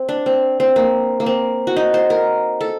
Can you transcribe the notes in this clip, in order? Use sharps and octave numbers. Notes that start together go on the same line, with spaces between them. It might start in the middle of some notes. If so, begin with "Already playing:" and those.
Already playing: C4
D4
C4
C4
A#3
A#3
C4
F#4
D#4
C5
A#4
A4